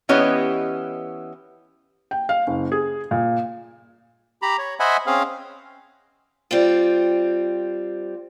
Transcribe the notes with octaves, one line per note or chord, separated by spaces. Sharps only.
E3 B3 C#4 G4 D#5
G5
F5
F#1
G#4
A#2
G4 A#5 B5
C#5
C5 D#5 E5 F#5 G#5 B5
C4 C#4 G#4 F5
G3 C4 F4